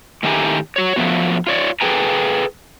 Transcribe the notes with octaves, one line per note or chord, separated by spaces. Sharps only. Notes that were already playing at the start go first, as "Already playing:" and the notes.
A2 D#3 A3 G4 G#5 A#5
F#4 C#5
F3 F#3 G#3 A3 B3 F#4
F4 C#5 D5
G#4 A4 B4 G5 G#5 A#5